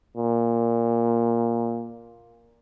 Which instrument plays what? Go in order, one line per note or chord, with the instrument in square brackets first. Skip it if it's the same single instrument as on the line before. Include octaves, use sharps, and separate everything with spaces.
[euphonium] A#2